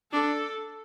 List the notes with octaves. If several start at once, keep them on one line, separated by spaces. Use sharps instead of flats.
D4 A4